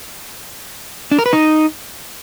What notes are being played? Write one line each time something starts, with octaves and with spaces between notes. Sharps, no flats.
D4
A#4
B4
D#4